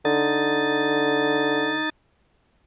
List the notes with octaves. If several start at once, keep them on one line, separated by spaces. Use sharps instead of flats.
D3 D#4 A6